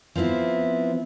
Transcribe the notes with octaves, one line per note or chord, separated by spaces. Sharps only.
F3 B3 C4 E4